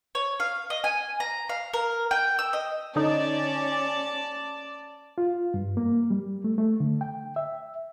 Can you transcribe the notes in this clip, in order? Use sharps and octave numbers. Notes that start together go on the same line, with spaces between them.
C#5
F5
D#5
G#5
A#5
F5
A#4
G5
E6
D#5
D3 C#4 D#4 D5 A5
F4
G2
A#3
G3
A3
A3
D3
G5
E5